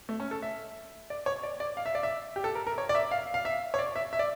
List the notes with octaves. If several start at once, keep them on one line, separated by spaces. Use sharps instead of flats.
A3
C#4
A4
E5
D5
C#5
D5
D5
F5
E5
D5
E5
G4
A4
A#4
A#4
C#5
D5
E5
F5
F5
E5
C#5
D5
E5
E5
D5